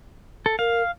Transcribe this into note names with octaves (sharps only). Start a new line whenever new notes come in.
A4
A#4 F5